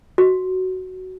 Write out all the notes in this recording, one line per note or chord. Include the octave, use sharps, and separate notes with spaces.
F#4